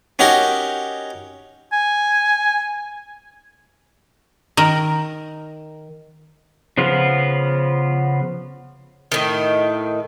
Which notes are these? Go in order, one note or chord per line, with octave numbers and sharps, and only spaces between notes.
C#4 D#4 F#4 G4 A#4
G#5
D#3 A#4
C#3 F3 B3 F4
A2 D#3